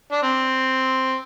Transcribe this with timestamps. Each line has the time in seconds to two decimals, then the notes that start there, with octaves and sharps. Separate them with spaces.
0.12 D4
0.23 C4